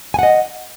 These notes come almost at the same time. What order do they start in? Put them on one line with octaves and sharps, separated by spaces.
G#5 F#5 D#5